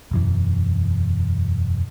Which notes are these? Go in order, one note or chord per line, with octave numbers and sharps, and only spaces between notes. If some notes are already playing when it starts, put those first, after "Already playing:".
E1 F#2 E3